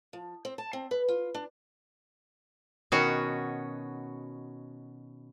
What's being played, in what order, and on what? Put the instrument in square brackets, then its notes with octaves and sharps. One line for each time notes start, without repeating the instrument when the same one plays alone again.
[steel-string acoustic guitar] F3
C4
A5
C4
B4
F4
D4
[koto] B2 D#3 C#4 F#4